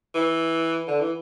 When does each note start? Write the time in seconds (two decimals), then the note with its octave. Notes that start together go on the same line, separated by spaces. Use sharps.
0.14 E3
0.88 D3
1.00 E3